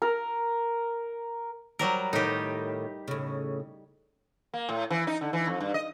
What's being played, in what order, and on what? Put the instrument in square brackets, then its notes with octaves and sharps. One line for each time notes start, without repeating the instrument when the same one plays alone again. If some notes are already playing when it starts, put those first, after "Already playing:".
[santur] A#4
[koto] F#3 G3 A#4
[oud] A2 D#3 [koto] D#4 G4
[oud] A2 C#3
[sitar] A#3
A2
E3
D#4
D3
E3
F2
G2
D#5